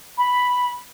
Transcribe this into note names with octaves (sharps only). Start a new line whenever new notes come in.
B5